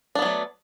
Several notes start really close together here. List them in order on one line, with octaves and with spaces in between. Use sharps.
D4 B3 F#3 A3